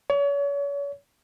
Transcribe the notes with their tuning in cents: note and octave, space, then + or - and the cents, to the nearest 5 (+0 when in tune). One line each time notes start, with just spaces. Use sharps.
C#5 +35